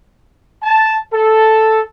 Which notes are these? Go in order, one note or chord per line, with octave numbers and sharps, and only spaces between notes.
A5
A4